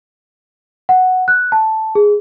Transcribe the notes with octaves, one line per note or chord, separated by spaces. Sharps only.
F#5
F#6
A5
G#4